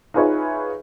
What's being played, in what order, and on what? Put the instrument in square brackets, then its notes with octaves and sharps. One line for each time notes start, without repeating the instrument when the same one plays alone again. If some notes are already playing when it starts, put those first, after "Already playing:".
[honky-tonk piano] D#4 F4 G#4 B4 C#5 E5